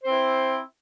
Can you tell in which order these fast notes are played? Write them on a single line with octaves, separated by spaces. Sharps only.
C5 C4 E4